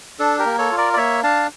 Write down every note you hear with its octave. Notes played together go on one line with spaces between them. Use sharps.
D4 A4
G4 A#4
A#3
A4 C#5
F4
A#4 D5
D5
A#3 C#5 E5
D4 F5 A5